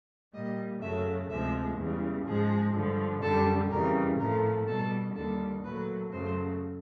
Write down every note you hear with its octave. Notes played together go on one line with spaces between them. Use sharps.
A#2 G3 D#5
F#2 C#3 F#3 A3 E5
D2 C3 F3 G#3 E5
E2 C#3 E3 G3
G#2 F3 G#3 G#4
G2 D3 F3
F#2 D3 G3 A4
F2 C#3 E3 G3 A#4
A2 F3 A3 A#4
B2 G3 A4
D#2 D3 G3 A4
A#2 F#3 A3 B4
F#2 C#3 F#3 A3 C5